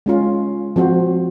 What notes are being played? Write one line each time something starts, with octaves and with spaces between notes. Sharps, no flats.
G#3 C#4 F4
F3 C4 F#4 C5